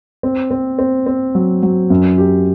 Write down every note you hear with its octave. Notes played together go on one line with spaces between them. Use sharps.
C4
C4
C4
C4
F#3
F#3
F#2
G4